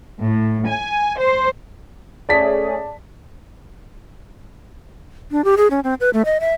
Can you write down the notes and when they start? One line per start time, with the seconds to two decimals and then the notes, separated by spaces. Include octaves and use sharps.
0.23 A2
0.68 G#5
1.18 C5
2.29 A3 C#4 G#4 D5 A5 B6
5.31 D4
5.44 G4
5.57 G#4
5.71 C#4
5.84 C4
6.00 B4
6.13 A3
6.25 D#5
6.40 E5